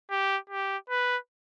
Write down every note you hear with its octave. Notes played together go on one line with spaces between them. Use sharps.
G4
G4
B4